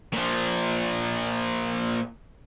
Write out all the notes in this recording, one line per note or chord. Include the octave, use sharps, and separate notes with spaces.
A#2 F3